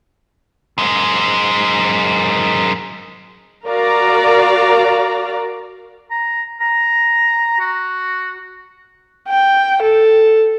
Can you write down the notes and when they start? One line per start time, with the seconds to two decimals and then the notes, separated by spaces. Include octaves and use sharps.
0.78 F#2 G#3
3.66 F#4 A#4 D5 F5 A#5
6.11 A#5
6.61 A#5
7.60 F#4
9.28 G5
9.82 A4